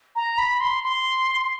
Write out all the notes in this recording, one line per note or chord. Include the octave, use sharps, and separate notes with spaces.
A#5
B5
C6
C6